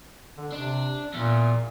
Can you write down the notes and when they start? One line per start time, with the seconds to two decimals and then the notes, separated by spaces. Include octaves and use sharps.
0.37 D3
0.53 C3 D4
1.14 E2 A#2